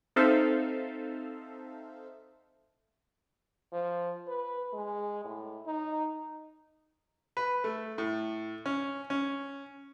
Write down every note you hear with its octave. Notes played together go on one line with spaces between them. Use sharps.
C4 D#4 A4 C5 E5 F5
F3
B4
G#3
A2
D#4
B4
A3
A2
C#4
C#4